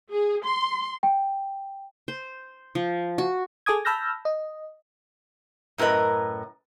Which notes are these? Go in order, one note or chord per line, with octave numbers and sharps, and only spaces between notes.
G#4
C6
G5
C5
F3
F#4
G#4 A4 G#5 D6 D#6 G#6
A5 B5 E6 F6 G6 A#6
D#5
F#2 A2 A#4 B4 D#5